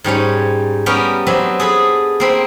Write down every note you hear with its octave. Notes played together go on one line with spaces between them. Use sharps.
G#2 G3 C#4 C#5
G3 B3 C#4 G4 A#4 G5
F#3 B3 C4 D4 E5
G#4 A4 B4
A#3 C4 B5